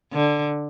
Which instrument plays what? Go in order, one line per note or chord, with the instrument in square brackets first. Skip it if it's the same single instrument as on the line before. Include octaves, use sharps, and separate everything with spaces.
[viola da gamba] D3